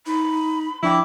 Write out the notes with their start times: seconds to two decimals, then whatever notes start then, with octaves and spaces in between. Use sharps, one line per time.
0.06 D#4 B5
0.83 F3 D4 E4 G5 D6